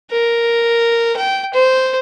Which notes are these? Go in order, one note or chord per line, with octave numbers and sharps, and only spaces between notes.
A#4
G5
C5